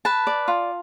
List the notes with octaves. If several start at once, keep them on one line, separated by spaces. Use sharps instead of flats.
B4 A5
D5
F4